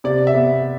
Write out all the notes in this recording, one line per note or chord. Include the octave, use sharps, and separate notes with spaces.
C3 D5
E5
B3